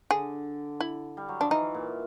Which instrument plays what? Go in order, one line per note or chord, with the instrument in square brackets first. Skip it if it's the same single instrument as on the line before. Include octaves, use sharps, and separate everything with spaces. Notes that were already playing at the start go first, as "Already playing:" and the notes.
[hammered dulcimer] D3 [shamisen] G#4
[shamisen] E4
[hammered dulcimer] G3
F#3
[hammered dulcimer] F3 [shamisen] D4
[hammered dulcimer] E3 [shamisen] D#4
[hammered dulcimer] A#2